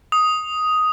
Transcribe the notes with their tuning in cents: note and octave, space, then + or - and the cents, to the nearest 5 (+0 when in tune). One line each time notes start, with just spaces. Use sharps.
D#6 +5